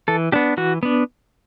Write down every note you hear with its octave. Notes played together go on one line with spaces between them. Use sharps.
E3 A4
B3 D4 G4
E3 F#4
B3 D4